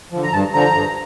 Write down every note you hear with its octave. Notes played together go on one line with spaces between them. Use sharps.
D3 F3
A#5
G2 A5
D3 F3 A#5
G2